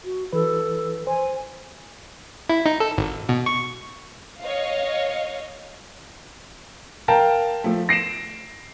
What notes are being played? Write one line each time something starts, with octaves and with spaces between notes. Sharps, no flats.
F#4
E3 A4 B4
C5 G#5
E4
D#4
A4
G#1
B2
C#6
C#5 D#5 F5
A#4 F5 G5 A5 A#5
F3 A3
A#6 C7 D7 E7